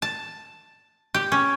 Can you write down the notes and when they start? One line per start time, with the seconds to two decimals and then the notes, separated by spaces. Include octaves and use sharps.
0.02 A5
1.14 G4
1.32 C#4